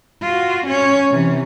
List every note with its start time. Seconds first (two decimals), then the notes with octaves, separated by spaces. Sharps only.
0.22 F4 F#4
0.67 C#4 C#5
1.11 C3 E3